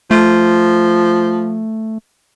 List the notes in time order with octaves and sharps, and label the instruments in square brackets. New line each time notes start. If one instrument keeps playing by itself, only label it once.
[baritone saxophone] F3 [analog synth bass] A3